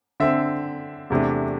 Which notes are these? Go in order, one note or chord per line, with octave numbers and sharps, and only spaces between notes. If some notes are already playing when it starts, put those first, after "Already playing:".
D3 C4 E5
E2 C3 A3 D4